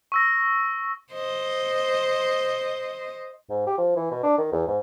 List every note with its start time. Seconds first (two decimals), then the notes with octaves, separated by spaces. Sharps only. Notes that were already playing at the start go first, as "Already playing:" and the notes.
0.12 C#6 E6 A#6
1.12 C5 D#5
3.50 G#2
3.66 G4
3.78 F3
3.97 E3
4.11 B2
4.23 D4
4.38 D#3
4.52 E2
4.68 G#2